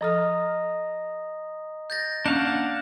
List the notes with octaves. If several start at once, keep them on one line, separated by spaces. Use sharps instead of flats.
F3 A4 D#5 A#5 D#6 F6
G6 A6 A#6
A#3 C#4 D4 F5 F#5 G6